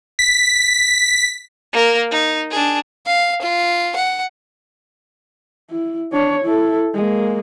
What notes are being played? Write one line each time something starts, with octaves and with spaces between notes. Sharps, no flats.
B6
A#3 A#4
D#4
D4 G#4
F5
F4
F#5
E4
D4 C#5
E4 A4
G#3 A#3